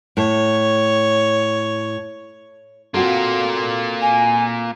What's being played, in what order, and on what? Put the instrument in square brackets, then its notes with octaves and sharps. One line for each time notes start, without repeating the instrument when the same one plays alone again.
[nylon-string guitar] A2 [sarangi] C#5
[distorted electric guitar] A#3 F4 [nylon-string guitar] C4 F#4 A4
[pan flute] G#5